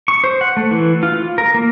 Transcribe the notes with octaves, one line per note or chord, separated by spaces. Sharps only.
C#6
C5
F#5
A3
E3
F4
A#4
A#3